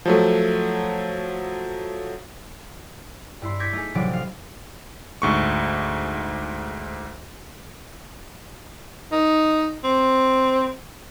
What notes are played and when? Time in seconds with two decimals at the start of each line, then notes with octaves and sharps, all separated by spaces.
0.06 F3 F#3 A3
3.42 G2 E4 C6
3.59 C#6 D6 G6 G#6 A#6 B6
3.73 A3 D#4 G#4
3.95 A1 C3 F3 F#3 D4 D6
4.10 D#4 F5
5.22 D2 G#2 C#6
9.12 D#4
9.84 C4